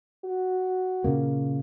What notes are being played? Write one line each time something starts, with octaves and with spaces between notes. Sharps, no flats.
F#4
A#2 C#3 A#3